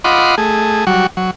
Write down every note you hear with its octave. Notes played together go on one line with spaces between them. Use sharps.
F4 D#5 F#5 B5 C6 D6
A3 G#4
F#3 G3 F#4
F#3